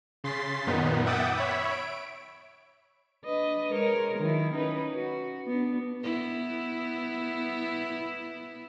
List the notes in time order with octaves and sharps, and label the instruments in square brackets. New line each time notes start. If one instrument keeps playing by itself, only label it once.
[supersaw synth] C#3 C6 A6 B6 C7
F#2 A#2 D#3 B3 D#4
E5 F#5 G5 D6 D#6 A6
C#5 E5 B5
D7
[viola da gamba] D4 B4 D#5
G#3 A#4 C#5
D#3 F#3 E4
C#4 D#4 B4
F#4
B3 D4
B3 E4